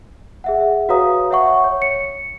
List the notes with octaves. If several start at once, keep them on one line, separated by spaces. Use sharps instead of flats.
G#4 E5 F#5
F#4 B4 C#5 F5 A#5 D#6
C#5 E5 F#5 C#6
C#5
C#7